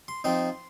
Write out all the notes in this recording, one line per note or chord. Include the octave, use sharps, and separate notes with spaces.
C6
F3 C4 D#4 C6